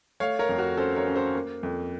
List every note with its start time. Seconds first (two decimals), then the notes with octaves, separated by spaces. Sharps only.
0.20 A3 C#5 F5
0.39 A#4 C#5
0.49 F2
0.58 F#4 A#4
0.77 C#4 A4 C5
0.96 A#4 C#5
1.07 C#4
1.16 A4 C5
1.35 A#3
1.63 F2